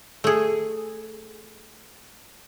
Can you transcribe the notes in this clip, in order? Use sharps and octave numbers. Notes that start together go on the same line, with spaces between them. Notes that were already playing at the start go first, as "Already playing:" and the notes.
A3 G#4